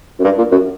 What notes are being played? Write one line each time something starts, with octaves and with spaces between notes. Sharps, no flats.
F#2
G2
A#2
F#2